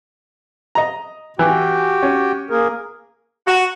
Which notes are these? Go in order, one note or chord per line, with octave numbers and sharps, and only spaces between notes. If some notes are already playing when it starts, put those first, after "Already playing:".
D#5 A#5
E3 F#4 G4 G5
C#4
A#3 G#4 A#4
F#4